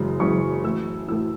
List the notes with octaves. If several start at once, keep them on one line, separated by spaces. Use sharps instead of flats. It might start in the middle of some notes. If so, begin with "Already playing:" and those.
Already playing: F#1 F#2 C#3 E3 G#3
F#1 F#2 C#3 E3 G#3 C#6
A2 E3 A3 E6
A2 E3 A3 E6